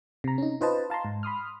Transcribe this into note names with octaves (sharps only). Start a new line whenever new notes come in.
C3 A#5
C#4 D#4
D#4 F4 B4 C5 D#5 A5
F5 A5 A#5 C6
G#2
B5 C6 D#6 F6